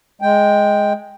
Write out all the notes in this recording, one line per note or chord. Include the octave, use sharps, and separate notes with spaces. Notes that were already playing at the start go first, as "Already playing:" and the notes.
G#3 G5